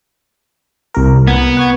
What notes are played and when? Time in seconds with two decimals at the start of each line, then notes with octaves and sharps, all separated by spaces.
0.94 C2 A#4
1.28 B3 G#6
1.57 F#5 C#6 G#6